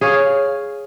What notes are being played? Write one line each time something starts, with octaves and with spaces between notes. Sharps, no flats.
G#4 C#5 F5